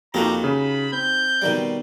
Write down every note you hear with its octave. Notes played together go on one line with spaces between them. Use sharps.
F2 A#3 D#4 F#4 G4 A#5
C#3 B5
C4 G6
B2 D#3 G3